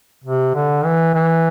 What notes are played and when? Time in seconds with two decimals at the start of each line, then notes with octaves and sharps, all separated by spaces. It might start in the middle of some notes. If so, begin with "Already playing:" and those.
0.24 C3
0.54 D3
0.84 E3
1.14 E3